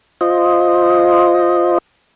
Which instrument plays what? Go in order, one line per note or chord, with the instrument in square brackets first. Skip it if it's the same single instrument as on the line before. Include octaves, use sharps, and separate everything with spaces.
[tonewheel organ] F4 C5 D#5